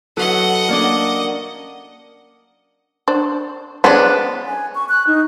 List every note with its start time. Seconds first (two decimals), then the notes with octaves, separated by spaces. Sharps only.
0.17 F#3 A4 B4 D#5 F#5
0.69 A#3 C#4 D4 A#4 D5 D6
3.08 D4 C5
3.84 G#3 B3 C#4 D4 C5
4.46 G#5
4.75 C#6
4.89 F#6
5.07 D#4